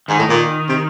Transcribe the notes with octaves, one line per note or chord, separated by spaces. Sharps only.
G#2 D#3
A2
A#2
C3